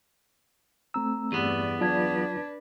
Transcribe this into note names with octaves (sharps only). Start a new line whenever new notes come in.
A3 C4 A#5 E6
E2 G2 B3 G4 D5 D#7
F#3 D4 F4 B4 D5 A5 G#6